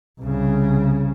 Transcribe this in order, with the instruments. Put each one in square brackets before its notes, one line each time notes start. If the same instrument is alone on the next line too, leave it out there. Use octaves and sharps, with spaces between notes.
[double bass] C2 C#3